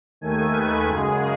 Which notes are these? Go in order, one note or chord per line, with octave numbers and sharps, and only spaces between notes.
D#2 D#3 A3 G#5
B4
F#2 C#3 G#3 G#4